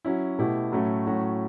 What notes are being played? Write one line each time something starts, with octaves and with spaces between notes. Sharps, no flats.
F#3 C#4 E4
B2 A3 E4 G4
A2 F#3 A3 C#4
A2 F#3 A3 C#4 F#4